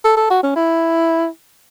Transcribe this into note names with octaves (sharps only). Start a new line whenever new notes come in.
A4
A4
F#4
C#4
E4